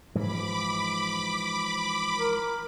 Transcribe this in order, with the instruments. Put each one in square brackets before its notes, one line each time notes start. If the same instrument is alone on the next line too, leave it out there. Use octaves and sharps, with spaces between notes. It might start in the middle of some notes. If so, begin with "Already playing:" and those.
[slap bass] G#2 E3 F3 [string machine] B5 D6
[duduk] A#4